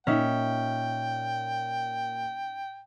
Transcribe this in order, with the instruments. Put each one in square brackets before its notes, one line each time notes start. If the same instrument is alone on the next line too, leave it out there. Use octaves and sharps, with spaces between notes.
[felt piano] A#2 [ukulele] C#4 D#4 E5 [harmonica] G5